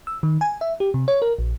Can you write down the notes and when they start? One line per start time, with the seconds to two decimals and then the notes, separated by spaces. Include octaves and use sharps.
0.07 E6
0.23 D#3
0.41 G#5
0.61 E5
0.80 G4
0.94 C3
1.08 C#5
1.22 A#4
1.39 A#1